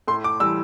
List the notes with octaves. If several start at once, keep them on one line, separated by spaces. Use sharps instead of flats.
A2 C6
D6
E3 G3 E6